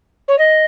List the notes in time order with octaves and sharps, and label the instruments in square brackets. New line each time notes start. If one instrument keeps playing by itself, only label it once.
[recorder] C#5
D#5